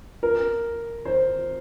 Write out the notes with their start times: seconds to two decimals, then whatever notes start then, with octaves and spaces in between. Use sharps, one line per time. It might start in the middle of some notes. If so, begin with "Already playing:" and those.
0.23 A#4
1.05 C5